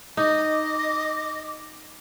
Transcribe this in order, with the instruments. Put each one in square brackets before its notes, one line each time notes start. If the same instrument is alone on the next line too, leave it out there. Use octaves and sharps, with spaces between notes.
[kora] D#4 [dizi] D#5 [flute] D6